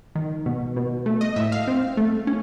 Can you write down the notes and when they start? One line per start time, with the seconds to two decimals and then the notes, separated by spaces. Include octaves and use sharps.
0.15 D#3
0.46 B2
0.76 B2
1.06 A3
1.21 D#5
1.36 A2 E5
1.52 F5
1.67 C4
1.97 A3
2.27 C#4